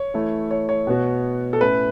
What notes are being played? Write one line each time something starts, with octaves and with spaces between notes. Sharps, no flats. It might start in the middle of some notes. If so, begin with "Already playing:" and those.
Already playing: C#5
E3 A3 E4
C#5
C#5
B2 B3 F#4
A4
A2 A3 C#4 E4 B4